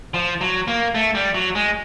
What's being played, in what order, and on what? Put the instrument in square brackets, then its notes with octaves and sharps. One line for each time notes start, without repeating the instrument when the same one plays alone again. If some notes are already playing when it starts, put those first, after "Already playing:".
[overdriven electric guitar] F3
F#3
A#3
A3
G3
F#3
G#3